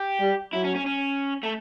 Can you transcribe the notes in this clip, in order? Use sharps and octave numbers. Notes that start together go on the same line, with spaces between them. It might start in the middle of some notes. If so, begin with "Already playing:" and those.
Already playing: G4
G3
F#3 E4
C#4
C#4
C#4
A3